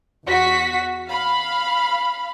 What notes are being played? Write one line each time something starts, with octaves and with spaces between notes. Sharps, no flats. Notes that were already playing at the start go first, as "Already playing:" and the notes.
E2 F#4 B6
F5 B5